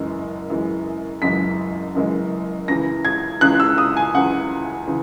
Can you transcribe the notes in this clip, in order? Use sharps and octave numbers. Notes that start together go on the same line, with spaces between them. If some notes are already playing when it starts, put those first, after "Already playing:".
Already playing: F#1 F#2 E3 G#3
F#1 F#2 E3 G#3
F#1 F#2 E3 G#3 B6
F#1 F#2 E3 G#3
C#2 C#3 E3 A#6
G#6
C#2 C#3 E3 F#6
E6
D#6
G#5
C#2 C#3 E3 F#5
C#3 E3